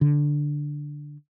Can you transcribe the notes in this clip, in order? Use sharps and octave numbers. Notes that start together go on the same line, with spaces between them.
D3